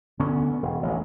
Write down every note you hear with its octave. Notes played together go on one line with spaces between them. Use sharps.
D2 D3 B3 C#4
E1
A1 D2